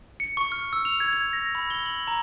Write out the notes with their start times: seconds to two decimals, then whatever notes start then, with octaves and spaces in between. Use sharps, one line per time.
0.20 C#7
0.37 C#6
0.52 F6
0.73 E6
0.85 F7
1.00 G#6
1.13 G#6
1.33 A#6
1.55 B5
1.70 G7
1.86 F#7
2.07 A#5